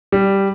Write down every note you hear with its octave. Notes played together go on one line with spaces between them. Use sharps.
G3